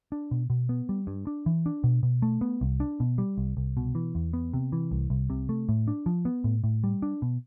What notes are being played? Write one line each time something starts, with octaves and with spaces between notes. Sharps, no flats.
D4
B2
B2
B3
G3
G2
D4
E3
D4
B2
B2
A3
B3
C2
D4
B2
G3
C2
C2
B2
E3
E2
B3
C3
E3
C2
C2
C3
A3
A2
D4
F3
B3
A2
A2
G3
D4
B2